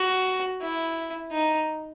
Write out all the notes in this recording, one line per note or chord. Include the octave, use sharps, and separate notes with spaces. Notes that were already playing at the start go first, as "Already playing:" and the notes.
Already playing: F#4
E4
D#4